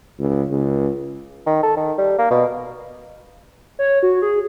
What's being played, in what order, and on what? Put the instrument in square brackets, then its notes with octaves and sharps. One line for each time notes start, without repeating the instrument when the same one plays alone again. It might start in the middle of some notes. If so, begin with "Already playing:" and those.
[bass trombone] C#2
C#2
[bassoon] D#3
A4
D#3
G3
A#3
B2
[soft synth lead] C#5
F#4
G#4